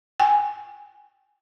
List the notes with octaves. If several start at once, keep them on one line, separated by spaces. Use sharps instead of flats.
G5 G#5